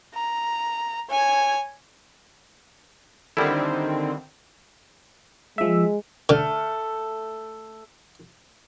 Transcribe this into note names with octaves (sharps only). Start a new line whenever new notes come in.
A#5
C#5 G#5
D3 D#3 G3 C4 E4
F3 G#3 E5
D3 A3 A4 F6